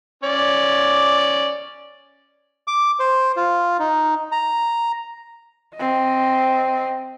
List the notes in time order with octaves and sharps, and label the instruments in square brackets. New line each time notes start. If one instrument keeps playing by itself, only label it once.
[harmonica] C#4 D5
[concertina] D6
C5
F4
D#4
A#5
[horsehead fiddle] C4 D#5